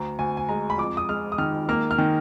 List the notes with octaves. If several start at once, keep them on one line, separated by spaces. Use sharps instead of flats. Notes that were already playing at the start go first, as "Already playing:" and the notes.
Already playing: D2 A#5
D2 G#5
G#5
G#3 A#5
B5
F2 D6
D#6
G#3 F6
D#6
D#3 F6
A#3 F6
F6
D#3